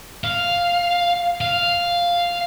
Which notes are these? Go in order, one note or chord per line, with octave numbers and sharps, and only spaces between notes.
F5
F5